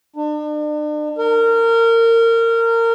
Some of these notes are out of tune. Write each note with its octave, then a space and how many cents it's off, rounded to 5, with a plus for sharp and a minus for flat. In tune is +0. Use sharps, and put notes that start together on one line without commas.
D4 +40
A#4 -25